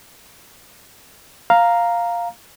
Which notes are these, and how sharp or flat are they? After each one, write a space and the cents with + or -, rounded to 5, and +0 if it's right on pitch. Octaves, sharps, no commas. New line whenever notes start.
F5 +0 A#5 +0